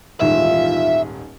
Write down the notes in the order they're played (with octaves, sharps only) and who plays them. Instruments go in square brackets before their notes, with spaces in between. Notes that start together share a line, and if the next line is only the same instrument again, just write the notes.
[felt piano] D#1 G#2 D#3 [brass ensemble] E3 F4 [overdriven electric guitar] E5